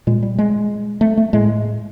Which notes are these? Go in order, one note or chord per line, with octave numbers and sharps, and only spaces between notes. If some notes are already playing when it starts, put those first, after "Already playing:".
A#2 G#3
G3
G#3
A3
A3
A2 G#3